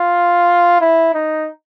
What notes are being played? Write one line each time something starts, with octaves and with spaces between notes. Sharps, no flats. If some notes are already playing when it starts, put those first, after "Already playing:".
Already playing: F4
E4
D#4